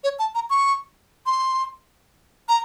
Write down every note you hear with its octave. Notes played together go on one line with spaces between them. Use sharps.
C#5
A5
A#5
C#6
C6
A#5